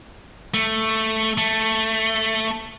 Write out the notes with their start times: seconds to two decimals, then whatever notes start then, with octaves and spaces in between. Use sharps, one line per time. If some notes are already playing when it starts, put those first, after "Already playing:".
0.54 A3
1.38 A3